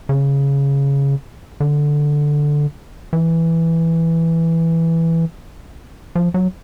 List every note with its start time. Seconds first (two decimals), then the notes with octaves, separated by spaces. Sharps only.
0.09 C#3
1.60 D3
3.13 E3
6.15 F3
6.34 F#3